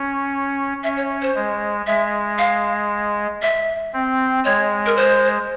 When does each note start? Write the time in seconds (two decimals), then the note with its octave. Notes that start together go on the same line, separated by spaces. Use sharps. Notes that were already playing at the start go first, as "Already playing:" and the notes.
Already playing: C#4
0.84 C#4 E5
0.97 C#5
1.22 C5
1.35 G#3
1.87 G#3 E5
2.38 F5
3.42 E5
3.94 C4
4.45 G#3 C#5
4.86 A#4
4.97 C5